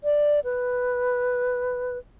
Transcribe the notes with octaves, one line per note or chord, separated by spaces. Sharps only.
D5
B4